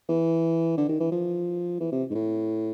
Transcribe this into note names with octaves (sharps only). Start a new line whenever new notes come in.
E3
D3
D#3
E3
F3
E3
C3
G#2
A2